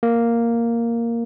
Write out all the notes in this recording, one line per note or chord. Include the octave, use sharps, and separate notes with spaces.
A#3